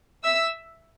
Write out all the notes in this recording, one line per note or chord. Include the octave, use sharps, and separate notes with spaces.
E5 E6